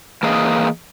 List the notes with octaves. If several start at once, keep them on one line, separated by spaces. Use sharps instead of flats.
E3 A#3 G#4 D#5